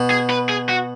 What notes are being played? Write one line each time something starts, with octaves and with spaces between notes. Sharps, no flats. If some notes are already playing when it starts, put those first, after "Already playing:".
Already playing: B2
G#4
B4
G#4
F#4